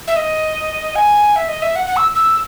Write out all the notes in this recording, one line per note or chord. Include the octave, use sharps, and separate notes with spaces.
E5
D#5
G#5
E5
D#5
E5
F#5
F#5
E6
E6